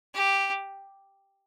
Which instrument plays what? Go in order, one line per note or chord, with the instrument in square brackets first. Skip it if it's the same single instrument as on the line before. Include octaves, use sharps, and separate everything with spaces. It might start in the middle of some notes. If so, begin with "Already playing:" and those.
[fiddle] G4